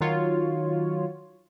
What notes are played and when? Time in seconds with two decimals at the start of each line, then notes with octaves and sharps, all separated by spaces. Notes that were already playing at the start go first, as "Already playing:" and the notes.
0.01 D#3 F#3 F4 C#5